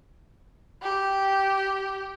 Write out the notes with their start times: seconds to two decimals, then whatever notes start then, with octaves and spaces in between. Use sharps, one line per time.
0.82 G4